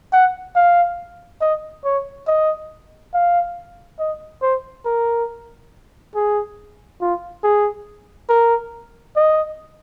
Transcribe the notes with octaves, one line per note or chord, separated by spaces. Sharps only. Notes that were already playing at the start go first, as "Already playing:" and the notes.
F#5
F5
D#5
C#5
D#5
F5
D#5
C5
A#4
G#4
F4
G#4
A#4
D#5